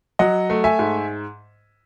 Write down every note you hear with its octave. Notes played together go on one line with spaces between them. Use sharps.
F#3 D#5 F#5
A3
E5 G#5
G#2